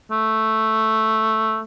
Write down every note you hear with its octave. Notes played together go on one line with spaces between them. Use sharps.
A3